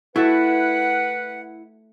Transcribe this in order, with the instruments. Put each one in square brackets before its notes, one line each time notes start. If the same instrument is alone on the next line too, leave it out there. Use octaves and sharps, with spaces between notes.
[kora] A3 F#4 A4 [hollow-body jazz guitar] E4 [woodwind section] B4 F#5